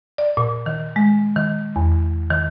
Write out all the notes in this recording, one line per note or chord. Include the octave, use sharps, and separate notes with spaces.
D5
A#2
D#3
G#3
D#3
E2
D#3